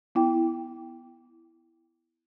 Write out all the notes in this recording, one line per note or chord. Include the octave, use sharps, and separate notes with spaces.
B3 E4 G5